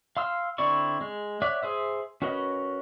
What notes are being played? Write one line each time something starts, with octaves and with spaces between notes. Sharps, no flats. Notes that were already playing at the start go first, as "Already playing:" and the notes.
F5 C6 E6 F6
D3 C4 E4 D5 C#6
G#3
C#5 D5 E5 F#5
G#4 C5 E5
C#4 F#4 A#4 B4 D#5